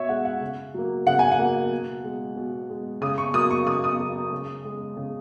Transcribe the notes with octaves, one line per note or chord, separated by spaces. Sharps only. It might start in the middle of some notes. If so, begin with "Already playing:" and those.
Already playing: B2 C#5 E5
G#3 F#5
F#5
C#3
F#3 A#3
C#3 F#5
G#5
F#5
F#3 A#3
B2
G#3
B2
G#3
C#3 D#6
C#6
F#3 A#3 D#6
C#6
C#3 D#6
D#6
F#3 A#3
C#3
G#3
C#3